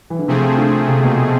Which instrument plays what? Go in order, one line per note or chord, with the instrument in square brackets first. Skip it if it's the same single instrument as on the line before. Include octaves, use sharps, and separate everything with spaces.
[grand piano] E3
D3
[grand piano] C3 [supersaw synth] F3 A3 C4 G#4
[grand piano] D3
C3
B2